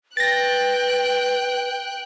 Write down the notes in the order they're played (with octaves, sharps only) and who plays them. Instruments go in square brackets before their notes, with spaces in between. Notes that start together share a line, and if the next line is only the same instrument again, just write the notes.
[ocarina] B4 [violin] G5 F#6 [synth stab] A6 A#6